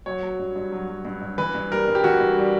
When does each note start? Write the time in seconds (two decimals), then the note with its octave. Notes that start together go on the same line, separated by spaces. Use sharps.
0.06 F#3 C#5
0.23 F#3
0.39 G2
0.56 G2
0.72 F#3
0.89 F#3
1.05 G2
1.21 G2
1.38 E3 B4
1.55 G2
1.71 G3 A#4
1.88 G2
1.95 G4
2.04 E3 F#4
2.21 G2
2.37 G3